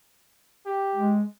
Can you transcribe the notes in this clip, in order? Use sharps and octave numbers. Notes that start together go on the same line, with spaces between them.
G4
G#3